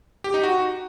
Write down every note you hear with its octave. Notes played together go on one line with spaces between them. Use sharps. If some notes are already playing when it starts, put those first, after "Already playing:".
G4
D#4
F#4